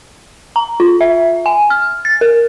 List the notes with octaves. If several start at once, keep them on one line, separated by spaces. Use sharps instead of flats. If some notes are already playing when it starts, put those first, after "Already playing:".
A#5
F4
E5
G#5
F6
A6
A#4